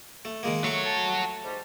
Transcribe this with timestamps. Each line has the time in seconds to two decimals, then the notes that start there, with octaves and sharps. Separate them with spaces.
0.25 A3
0.43 D#3 G#3 A#3
0.64 A3 F#4 C#5 C#6
0.85 A5
1.43 G#2 G3